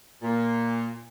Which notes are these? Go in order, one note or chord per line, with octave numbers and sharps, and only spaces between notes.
A#2